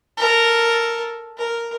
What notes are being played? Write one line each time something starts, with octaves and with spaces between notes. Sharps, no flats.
A4 A#4
A#4